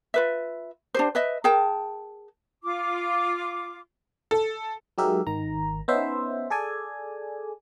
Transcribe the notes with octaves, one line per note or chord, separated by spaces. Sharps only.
F4 B4 E5
D4 G4 C5
B4 D#5 E5
G#4 A#4 G5 A5
F4 D6
A4
F#3 G#3 D#4 G4 A#4 E5
G#1 D#3 A#5
B3 C#4 D#4 C5 E5
G#4 A4 D5 G#5